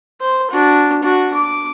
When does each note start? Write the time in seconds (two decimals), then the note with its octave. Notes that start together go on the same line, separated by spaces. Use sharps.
0.21 C5
0.51 D4 F#4
1.03 D4 F#4
1.34 D6